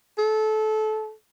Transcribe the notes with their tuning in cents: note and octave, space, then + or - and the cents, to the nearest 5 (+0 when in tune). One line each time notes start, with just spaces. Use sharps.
A4 -25